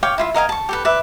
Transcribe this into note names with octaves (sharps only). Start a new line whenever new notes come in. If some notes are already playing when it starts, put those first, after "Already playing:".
C#5 F5 G5 D6
E4 F4 E5
A#4 D#5 F5 G#5
A5 C#6
G4 A4 B4
B4 D5 E5